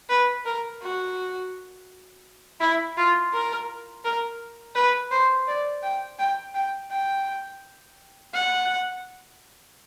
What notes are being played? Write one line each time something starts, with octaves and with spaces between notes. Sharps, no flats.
B4
A#4
F#4
E4
F4
A#4
A#4
B4
C5
D5
G5
G5
G5
G5
F#5